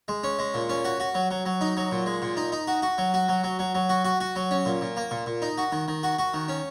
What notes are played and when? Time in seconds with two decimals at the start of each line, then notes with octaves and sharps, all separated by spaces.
0.08 G#3
0.23 C#4
0.39 G#3
0.54 A#2
0.69 C#4
0.85 F#4
1.00 F#4
1.15 F#3
1.31 F#3
1.45 F#3
1.61 D#4
1.77 F#3
1.91 A#2
2.06 G#3
2.22 A#2
2.37 D#4
2.52 D#4
2.68 F#4
2.82 F#4
2.98 F#3
3.14 F#4
3.28 F#3
3.44 F#3
3.59 F#3
3.75 F#3
3.89 F#4
4.05 F#4
4.20 F#4
4.36 F#3
4.51 C#4
4.65 A#2
4.81 A#2
4.97 A#3
5.11 A#2
5.26 A#2
5.42 D#4
5.58 F#4
5.72 D#3
5.88 D#3
6.03 F#4
6.19 F#4
6.34 D#3
6.48 C#4